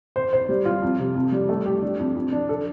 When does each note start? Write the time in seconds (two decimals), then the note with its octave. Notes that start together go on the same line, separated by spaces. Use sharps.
0.16 C5
0.33 C5
0.49 G3
0.65 F4
0.82 F2
0.99 C3
1.15 F2
1.32 G3
1.49 A3
1.66 G4
1.82 D4
1.99 F2
2.16 F2
2.32 D4
2.49 A4